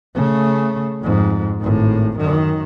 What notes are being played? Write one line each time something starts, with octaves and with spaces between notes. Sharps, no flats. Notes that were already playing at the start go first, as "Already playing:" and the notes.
C#3 A3
F2 G#2
G#1 A2
F#2 D#3